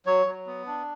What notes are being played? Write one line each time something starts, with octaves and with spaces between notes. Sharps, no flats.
F#3 C#5
F#3
B3
D4